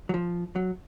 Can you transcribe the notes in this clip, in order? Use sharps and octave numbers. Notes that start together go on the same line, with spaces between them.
F#3
F3
F#3